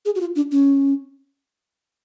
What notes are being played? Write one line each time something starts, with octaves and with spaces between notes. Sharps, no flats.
G#4
F#4
F4
D4
C#4